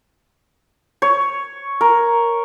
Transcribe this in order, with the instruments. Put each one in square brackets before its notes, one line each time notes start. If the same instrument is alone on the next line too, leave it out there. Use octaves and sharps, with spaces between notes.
[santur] C#5
A#4